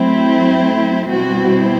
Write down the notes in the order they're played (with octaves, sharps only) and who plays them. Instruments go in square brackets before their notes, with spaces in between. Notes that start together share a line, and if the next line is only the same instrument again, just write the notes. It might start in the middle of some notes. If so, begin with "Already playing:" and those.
Already playing: [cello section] F#3 A3 C4 E4
B2 G3 C4 E4 F#4